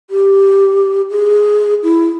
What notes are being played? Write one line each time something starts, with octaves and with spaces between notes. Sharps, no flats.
G4
G#4
E4